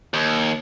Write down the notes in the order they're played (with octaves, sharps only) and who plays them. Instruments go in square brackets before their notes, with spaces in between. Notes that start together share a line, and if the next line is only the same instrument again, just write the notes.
[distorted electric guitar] D#2